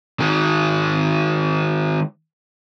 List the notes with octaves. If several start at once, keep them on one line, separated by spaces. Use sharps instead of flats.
D#3 G#3